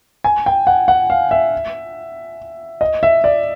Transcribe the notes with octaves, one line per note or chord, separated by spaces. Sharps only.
G#5
G5
F#5
F#5
F5
E5
D#5
E5
D5